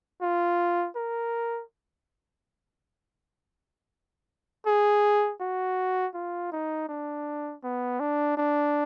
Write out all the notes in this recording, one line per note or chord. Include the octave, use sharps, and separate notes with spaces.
F4
A#4
G#4
F#4
F4
D#4
D4
B3
D4
D4